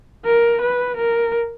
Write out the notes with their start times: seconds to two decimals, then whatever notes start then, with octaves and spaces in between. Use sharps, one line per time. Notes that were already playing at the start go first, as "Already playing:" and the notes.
0.25 A#4
0.61 B4
0.97 A#4